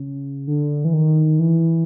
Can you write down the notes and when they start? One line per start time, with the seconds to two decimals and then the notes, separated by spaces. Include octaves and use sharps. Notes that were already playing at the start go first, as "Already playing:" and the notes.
Already playing: C#3
0.47 D3
0.85 E3
0.93 D#3
1.39 E3